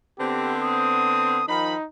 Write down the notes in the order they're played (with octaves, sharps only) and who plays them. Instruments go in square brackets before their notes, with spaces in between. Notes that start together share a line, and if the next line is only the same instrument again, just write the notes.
[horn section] D3 B3 C4 [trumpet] G4
[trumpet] D#6
[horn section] D#3 F3 B5 [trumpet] D#4